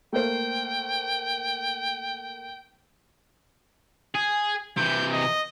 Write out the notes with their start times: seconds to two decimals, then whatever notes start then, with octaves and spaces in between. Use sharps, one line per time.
0.13 A3 A#3 C5 G5
4.15 G#4
4.77 C3 E3 G6
5.13 D#5